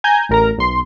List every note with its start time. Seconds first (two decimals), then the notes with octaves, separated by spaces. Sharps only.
0.04 G#5 A#5 G6
0.29 A1 A#4 A#5
0.58 B1 C6